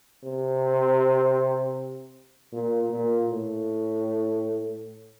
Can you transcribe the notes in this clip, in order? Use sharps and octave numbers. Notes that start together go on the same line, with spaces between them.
C3
A#2
A#2
A2